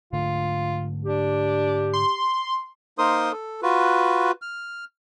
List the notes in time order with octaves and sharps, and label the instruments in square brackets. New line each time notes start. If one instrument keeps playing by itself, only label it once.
[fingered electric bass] G#2 D3 A3 [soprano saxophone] F4
[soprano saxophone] D4 [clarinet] G4
[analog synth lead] C6
[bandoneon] A#3 D#4 A#4 C5 C6 D#6
A4
F4 F#4 B4
F6